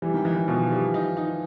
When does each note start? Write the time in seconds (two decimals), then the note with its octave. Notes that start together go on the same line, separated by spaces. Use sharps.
0.02 E3 G3
0.14 D#3
0.25 E3 D#4
0.36 E3
0.48 B2 F3
0.71 G3
0.94 D#4
1.17 D#4